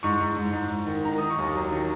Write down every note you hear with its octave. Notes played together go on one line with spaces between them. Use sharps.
G#2 C#6
G#2
G#2
G#2
G#2
D#3
D#3 A#5
D#3 D#6
C#6
D#2
F#3
D#3